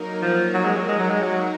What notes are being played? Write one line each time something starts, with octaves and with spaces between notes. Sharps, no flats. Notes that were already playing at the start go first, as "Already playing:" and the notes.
Already playing: F#3 A#3 D#4 A#4
F3
F#3
G#3
F#3
G#3
F#3
G#3
F#3